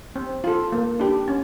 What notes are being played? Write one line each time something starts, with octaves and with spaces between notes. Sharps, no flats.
C4
F4 A4
A#3
D4 G4
C#4